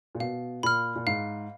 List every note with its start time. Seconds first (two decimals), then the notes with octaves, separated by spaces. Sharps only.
0.15 A#2
0.20 B2 F5
0.63 A#2 B5 F6
0.96 A#2
1.07 G#2 F5